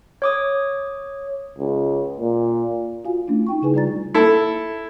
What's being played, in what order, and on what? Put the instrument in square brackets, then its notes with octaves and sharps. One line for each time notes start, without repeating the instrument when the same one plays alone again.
[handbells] C#5 D6 D#6
[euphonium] C#2
A#2
[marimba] F4 F#4 F5 G#5
A3 C#4 D4 E4
D#4 G5 C#6
C#3 D#4 E4 G#4 B4 G#5
G3 F4 D5 A#5 A6
[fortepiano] E4 A4